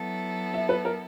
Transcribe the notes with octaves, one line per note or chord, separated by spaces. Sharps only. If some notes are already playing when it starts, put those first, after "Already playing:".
Already playing: F#3 B3 E4 A4
E5
B4
A#4